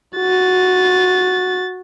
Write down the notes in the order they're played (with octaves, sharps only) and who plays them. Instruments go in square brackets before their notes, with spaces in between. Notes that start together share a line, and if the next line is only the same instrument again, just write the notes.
[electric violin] F#4 A6